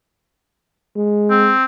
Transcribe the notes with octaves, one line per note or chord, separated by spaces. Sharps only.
G#3
C4